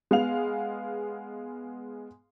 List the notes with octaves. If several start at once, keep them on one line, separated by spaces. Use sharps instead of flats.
G#3 B3 F5 F7